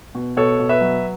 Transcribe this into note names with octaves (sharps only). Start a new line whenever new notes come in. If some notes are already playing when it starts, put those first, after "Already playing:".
B2
B2 A4 C#5
B2
B4 E5
F#3